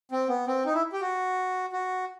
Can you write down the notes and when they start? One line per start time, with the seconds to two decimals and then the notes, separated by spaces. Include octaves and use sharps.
0.12 C4
0.29 B3
0.47 C4
0.66 D#4
0.74 E4
0.93 G4
1.01 F#4
1.73 F#4